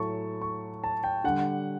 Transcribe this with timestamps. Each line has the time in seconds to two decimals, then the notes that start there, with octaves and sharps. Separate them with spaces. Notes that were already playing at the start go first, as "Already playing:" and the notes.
Already playing: A2 F#3 A3 A5 C#6
0.42 C#6
0.84 A5
1.04 G5
1.24 D3 G3 F#5